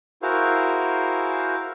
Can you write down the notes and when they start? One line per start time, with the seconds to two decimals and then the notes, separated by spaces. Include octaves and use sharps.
0.22 E4 F#4 G#4 A#4 C5 F5